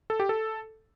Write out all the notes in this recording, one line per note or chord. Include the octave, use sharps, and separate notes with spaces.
A4
G4
A4